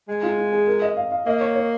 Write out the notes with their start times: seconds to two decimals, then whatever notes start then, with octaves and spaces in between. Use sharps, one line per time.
0.08 G#3
0.23 F4
0.37 F4
0.53 G#4
0.67 A#4
0.82 D#5
0.97 F5
1.12 F5
1.26 A#3 D#5
1.41 C#5
1.56 C#5